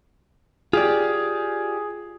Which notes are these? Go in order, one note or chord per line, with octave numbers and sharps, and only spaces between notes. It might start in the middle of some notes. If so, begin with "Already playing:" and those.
F4 G4 G#4 D5